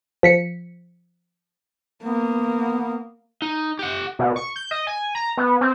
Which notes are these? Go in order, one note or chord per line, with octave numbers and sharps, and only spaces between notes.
F3 B6 C#7
A#3 B3
D#4
G4 F#5
B2
C#6
G6
D#5
G#5
A#5
B3
C4